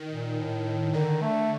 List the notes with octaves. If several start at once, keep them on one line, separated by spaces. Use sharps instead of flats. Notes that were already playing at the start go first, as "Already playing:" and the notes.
Already playing: D#3
A#2
A2
D3 D#3
A3